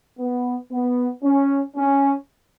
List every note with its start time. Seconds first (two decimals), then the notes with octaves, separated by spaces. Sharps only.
0.19 B3
0.72 B3
1.24 C#4
1.76 C#4